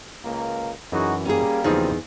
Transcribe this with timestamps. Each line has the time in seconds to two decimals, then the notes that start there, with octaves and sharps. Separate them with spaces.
0.25 C#2 A#3
0.92 F#2 E3 D#4 F#4 G#4
1.25 G3 A#3 C#4 G#4
1.64 E2 C#3 F3 C4 D#4 G#4